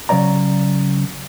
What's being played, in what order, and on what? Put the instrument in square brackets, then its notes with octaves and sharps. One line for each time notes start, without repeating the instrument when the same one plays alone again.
[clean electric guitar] C#3 F#3 C#5 D5 A#5